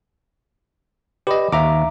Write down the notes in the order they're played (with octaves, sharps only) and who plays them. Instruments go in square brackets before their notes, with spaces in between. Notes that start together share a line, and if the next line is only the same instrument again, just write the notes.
[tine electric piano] G4 D#5 [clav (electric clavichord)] B4 D5
[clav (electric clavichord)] D#2 [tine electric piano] E5 A#5 D6